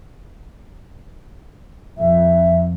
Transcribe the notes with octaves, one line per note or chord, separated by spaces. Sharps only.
F2 E5